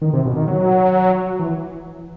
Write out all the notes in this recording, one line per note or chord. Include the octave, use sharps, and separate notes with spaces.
D#3
C3
B2
D#3
F#3
E3